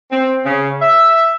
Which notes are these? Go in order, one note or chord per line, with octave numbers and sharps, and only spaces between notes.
C4
C#3
E5